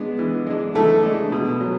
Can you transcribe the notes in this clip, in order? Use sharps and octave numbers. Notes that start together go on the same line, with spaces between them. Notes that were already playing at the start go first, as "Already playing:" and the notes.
Already playing: G#3 B3 D4
E3
G#3 D4
E3 A3 A4
G#3 D4
B2
F#3